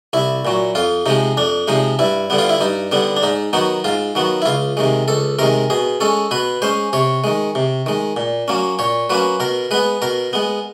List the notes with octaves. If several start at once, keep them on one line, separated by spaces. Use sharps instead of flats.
C2 E4
A#2 F#3
F2 F4
C3 F3 G#3 D#4
F2 D4
C3 F3 G#3 D#4
G2 E4
D3 G3 B3
F4
E4
G2 D#4
D3 G3 B3
D4
G#2 D#4
D#3 F#3 B3 D#4
G#2 F4
D#3 F#3 B3
E4
C#2 F4
C3 D#3 G#3
C#2 A4
C3 D#3 G#3 A#4
B2 G#4
G#3 C#4 A4
B2 B4
G#3 C#4 C5
C3 C#5
D#3 G#3
C3
D#3 G#3
A#2
F#3 A#3 C#4
A#2 C#5
F#3 A#3 C#4 B4
B2 A#4
G#3 B3 B4
B2 A#4
G#3 B3